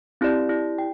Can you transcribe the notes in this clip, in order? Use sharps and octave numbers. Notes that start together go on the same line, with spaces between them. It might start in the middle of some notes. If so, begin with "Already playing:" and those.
C4 E4 G4 D5
E4 G4 D5
G5